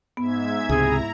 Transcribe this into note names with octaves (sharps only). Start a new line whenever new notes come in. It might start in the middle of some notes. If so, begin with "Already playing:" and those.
G#2 B3 E5 G#6
C#2 C3 E4 G#4 A#5